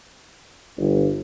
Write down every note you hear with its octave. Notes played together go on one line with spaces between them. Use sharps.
G1